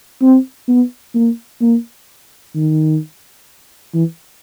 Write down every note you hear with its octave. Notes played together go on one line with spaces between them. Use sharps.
C4
B3
A#3
A#3
D#3
E3